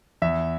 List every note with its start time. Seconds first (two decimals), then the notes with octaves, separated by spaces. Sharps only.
0.22 E2 E5